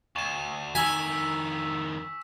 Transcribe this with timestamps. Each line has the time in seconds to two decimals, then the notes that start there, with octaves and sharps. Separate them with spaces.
0.16 D2 C#6 E7
0.75 F2 D#3 G#5 E6 B6